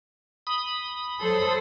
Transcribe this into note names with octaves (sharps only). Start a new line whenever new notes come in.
B5 D#6
F#3 A4 C5